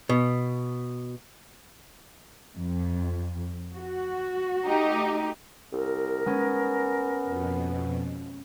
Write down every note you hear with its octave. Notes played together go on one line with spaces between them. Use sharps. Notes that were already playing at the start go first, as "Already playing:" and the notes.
B2
F2
F#4
A3 D#4 G4
C2 A#4
G#3 B3 C#4
F2 B2